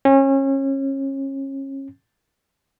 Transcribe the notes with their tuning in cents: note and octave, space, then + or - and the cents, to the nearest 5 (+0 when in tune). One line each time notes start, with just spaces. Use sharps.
C#4 -30